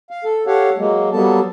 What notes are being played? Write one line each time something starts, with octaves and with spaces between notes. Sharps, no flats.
F5
A4
G4 A4 C#5 F5 F#5
F#3 G#3 A#3
F#3 G3 A#3 B3 A4 A5